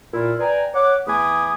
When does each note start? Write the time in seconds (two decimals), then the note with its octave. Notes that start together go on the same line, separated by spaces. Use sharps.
0.13 A#2 E4 F4
0.40 B4 D5 G5 G#5 A#5
0.74 C#5 F#5 D6
1.07 E2 A3 G#5 B5 D6 D#6